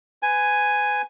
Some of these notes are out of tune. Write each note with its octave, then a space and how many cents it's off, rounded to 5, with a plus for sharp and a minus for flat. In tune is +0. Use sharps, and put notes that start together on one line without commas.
B4 +30 G#5 +0